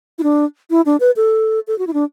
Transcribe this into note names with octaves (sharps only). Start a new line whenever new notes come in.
E4
D4
E4
D4
B4
A4
A4
F#4
E4
D4